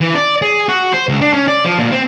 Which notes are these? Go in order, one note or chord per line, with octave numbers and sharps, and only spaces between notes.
E3
D5
G#4
F#4
C5
C#2
D4
C#4
D5
F3
A#2
C4